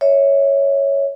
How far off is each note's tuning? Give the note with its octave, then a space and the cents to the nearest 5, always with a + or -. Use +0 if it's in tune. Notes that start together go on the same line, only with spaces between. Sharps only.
C#5 +0 E5 -20